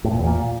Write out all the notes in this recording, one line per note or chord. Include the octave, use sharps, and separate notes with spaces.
A2
A#2
E2
A#2